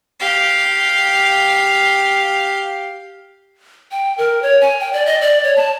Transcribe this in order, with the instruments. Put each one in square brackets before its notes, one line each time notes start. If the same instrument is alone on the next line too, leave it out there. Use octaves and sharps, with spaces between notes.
[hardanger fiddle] G4 F5
[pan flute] G5
A#4
C#5
G#5
G5
D5
D#5
D5
C#5
A5